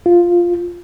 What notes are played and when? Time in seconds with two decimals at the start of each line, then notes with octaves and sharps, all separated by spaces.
0.06 F4